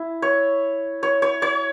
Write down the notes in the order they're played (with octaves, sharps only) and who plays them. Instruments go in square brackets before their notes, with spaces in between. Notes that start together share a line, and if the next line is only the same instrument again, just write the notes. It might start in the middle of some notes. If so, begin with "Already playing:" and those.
Already playing: [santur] E4
C#5
C#5
C#5
C#5